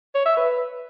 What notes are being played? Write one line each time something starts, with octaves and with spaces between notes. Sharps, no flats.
C#5
E5
B4